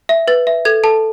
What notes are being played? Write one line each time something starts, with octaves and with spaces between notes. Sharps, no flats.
E5
B4 A6
E5
A4 G#6
A4 A5